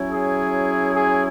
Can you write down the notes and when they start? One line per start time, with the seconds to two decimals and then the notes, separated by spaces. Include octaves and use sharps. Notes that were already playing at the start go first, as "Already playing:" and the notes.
Already playing: F#3 C#4 E4
0.09 G#4
0.94 G#4